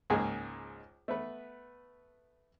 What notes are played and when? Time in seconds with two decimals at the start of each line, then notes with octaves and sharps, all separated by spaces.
0.10 C#2 G#2 A#3 G#4
1.08 A3 B3 B4